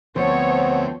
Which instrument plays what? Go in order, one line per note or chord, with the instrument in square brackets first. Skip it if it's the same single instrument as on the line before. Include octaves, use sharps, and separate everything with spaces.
[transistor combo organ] D2 C4 [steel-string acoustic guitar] F3 [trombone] B3 [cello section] C#5